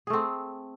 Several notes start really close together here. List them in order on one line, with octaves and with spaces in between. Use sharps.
G#4 A3 C4